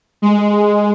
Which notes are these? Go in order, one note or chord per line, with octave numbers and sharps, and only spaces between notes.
G#3